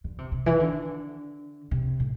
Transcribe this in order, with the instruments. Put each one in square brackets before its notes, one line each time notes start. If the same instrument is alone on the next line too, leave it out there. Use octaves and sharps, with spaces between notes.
[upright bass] D3
C3
C3
E3
D3
C3
A2